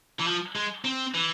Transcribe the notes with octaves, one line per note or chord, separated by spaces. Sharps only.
E3
F3
G#3
C4
E3